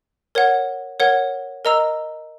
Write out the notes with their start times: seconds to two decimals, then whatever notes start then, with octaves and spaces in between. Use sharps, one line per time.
0.35 A#4 C#5 F#5
1.00 A#4 C#5 F#5
1.65 A#4 D#5 A#5 E6